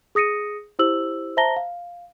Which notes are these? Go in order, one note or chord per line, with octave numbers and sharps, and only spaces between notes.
G#4 D#6 A#6 C#7 D#7
E4 G4 C5 E6 F#7
C5 E5 A5 A#5 A#6 G7
F5